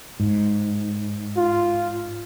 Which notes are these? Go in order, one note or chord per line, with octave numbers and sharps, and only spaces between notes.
G#2
F4